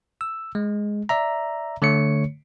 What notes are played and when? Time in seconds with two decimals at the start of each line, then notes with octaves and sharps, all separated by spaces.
0.21 E6
0.55 G#3
1.09 D5 E5 A#5
1.82 D3 A3 C#5 C#7